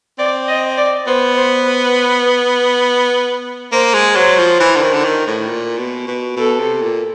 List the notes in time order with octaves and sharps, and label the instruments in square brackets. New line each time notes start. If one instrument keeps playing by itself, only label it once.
[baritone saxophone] C4 [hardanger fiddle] D5
[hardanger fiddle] D#5
D5
[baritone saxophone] B3 [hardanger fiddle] C5
[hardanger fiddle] C5
B4
[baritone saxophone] A#3 [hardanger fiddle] C5
[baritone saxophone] G#3
[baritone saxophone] F#3 [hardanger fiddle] C5
[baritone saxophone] F3
E3
D3
D#3
D3
D#3
A2
A#2
B2
B2
[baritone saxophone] B2 [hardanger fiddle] A4
[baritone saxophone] C3
A#2